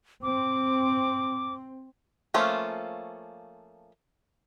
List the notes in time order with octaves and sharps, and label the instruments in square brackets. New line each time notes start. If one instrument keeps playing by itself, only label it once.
[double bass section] C4 [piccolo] D6
[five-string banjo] F3 A3 A#3 C#4 F4